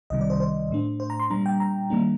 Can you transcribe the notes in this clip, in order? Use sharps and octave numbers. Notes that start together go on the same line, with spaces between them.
C2 C3 D#3 G3 D#5
D5
C5
C5
A2 A3 D4
C5
A#5
C6
A#2 G3 D4 A#5
G5
A#5
D#3 G3 A#3 D4